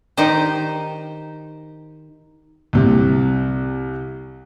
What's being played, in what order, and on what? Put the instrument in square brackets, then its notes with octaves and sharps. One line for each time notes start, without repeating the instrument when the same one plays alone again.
[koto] D#3 D#4 G4 C5
[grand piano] C2 C3